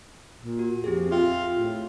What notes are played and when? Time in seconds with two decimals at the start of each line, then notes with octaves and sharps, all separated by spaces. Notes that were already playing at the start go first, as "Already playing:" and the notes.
0.41 A#2
0.59 F#4
0.84 F2 C4 G4 G#4
1.11 F4 E5 G5
1.57 A2